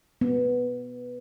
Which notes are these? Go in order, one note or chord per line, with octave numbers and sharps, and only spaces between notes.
B3